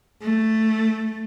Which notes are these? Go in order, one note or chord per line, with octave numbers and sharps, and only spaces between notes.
A3